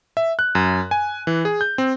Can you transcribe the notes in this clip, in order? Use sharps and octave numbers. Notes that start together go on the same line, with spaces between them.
E5
F#6
F#2
G#5
E3
G#4
G6
C4